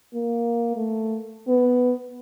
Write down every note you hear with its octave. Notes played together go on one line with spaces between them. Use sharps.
A#3
A3
B3